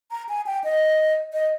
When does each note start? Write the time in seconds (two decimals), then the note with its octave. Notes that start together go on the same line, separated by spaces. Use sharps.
0.11 A#5
0.29 G#5
0.46 G5
0.64 D#5
1.33 D#5